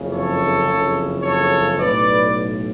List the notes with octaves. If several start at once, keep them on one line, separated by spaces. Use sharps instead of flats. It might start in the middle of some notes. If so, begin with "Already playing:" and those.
Already playing: F#1 F2 C#3
A4 C#5
F#1 F2 C#3
A4 C#5
B1 A2 B4 D5